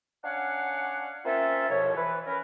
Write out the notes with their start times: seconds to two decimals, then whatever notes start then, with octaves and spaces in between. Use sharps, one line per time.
0.24 C#4 D4 C#5 F5 F#5
1.25 A#3 C4 C#4 F4 A4 E5
1.69 C2 F2 B2 F3 C#5
1.96 E3 B4
2.27 C#4 A#4 B4